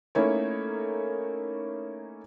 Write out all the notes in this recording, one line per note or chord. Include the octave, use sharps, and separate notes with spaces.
A3 A#3 C#4 D#4 E4 C#5